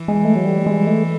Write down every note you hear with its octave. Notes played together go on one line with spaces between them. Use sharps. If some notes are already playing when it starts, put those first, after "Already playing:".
Already playing: E3
G#3
A3
F#3
G3
G#3
A3